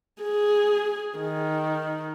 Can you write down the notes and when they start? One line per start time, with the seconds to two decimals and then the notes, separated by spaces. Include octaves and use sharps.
0.23 G#4
1.19 D#3